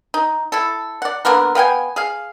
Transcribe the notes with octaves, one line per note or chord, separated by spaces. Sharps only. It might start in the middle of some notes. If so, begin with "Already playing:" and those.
D#4
E4 A4
D5 F#5
D3 A#3 B3 A#4
B3 F5 G5 G#5
G#4 F5